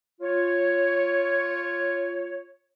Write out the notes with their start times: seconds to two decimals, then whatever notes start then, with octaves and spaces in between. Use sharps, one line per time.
0.20 F4 C#5